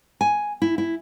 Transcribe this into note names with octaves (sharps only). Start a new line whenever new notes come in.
G#5
E4
E4